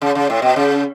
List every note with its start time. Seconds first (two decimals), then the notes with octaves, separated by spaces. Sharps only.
0.02 C#3
0.15 C#3
0.30 A2
0.42 B2
0.56 C#3